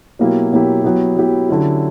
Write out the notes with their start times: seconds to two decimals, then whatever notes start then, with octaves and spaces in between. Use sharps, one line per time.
0.19 B2 F#3 A#3 E4 G4
0.52 B2 F#3 A#3 E4 G4
0.84 F#3 B3 E4 G4
1.16 F#3 B3 E4 G4
1.49 D3 F#3 C#4 E4 G4